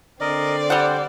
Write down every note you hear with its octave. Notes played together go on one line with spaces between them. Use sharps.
D3 C4 A#4 D5 D#5
G3 C5 F#5